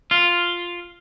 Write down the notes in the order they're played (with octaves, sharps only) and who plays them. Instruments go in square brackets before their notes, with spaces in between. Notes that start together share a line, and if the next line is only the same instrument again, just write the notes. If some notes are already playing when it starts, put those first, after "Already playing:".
[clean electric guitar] F4